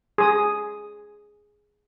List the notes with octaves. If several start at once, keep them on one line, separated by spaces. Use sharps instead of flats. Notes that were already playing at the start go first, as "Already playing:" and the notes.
G#4 D#6